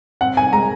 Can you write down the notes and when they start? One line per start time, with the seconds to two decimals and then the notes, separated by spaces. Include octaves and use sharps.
0.21 C4 F#5
0.37 G#5
0.53 G#3 A#5